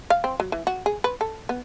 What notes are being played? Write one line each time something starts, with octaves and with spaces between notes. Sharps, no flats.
F5
C4
F#3
E3
F#4
G#4
B4
A4
B3